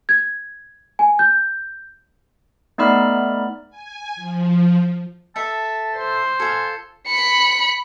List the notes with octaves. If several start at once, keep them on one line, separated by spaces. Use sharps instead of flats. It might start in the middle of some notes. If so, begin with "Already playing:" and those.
G#6
G#5
G6
A3 B3 D#4 D5 B5 F6
G#5
F3
A4 E5 A5
C5
F4 A4 G#5
B5 C#7